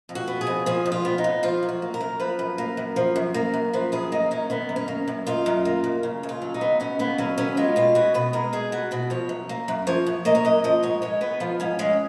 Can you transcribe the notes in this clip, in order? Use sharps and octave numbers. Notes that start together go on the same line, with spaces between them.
F2
F#4
B3
G#4
F2
F3 G#4
F2
F4
B3
D#4
F2
F3 F4
F#2
F#4
A#3
A#4
F#2
F3 B4
F#2
A#3
F#2
F3
F#2
A#3
F#2
F3 B4
F#2 G#4
A#3 D#4
F#2 C#4
D#3 B3
F#2
C#4
A#3
F#2
D#3 F4
F#2
A#3
F#2
C#3
D#2
F4
F#3
D#4
B3
C#3 C#4
D#2 B3
F#3 C#4
B3 C#4
G#3 F4
B2 F4
B3 F#4
B2 B4
G#3 A#4
B2 G#4
B3 F#4
B2 F#4
F3 C#5
F#2
A#3
F#2
F3 C#5
F#2
A#3 D#5
C#5
F#2 D#5
F3 D#5
G#2 C#5
G#3 C#5
B3 B4
F3 F4
G#2 C#4
G#3 C#4